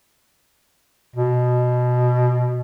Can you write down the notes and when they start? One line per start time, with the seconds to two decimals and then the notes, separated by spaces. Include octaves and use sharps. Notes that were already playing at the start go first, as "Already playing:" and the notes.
1.16 B2